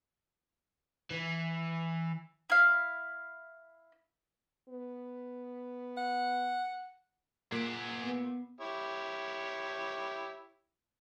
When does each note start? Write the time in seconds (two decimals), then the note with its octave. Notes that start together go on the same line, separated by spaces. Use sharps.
1.10 E3
2.50 E4 F5
4.69 B3
5.97 F#5
7.52 A#2 A#3 G#4 F#5 B6 D7
8.03 B3
8.61 E4 G4 C#5